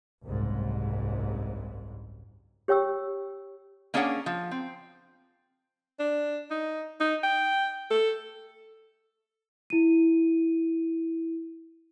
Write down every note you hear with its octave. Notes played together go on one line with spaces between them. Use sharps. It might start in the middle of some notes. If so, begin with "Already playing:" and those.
F#1 C2 G#2
G4 C#5 G5 C#6 E6
A#3 C#4 D4 G#4 C#5 F#5
F3
C4
D4
D#4
D#4
G5
A4
E4 D#7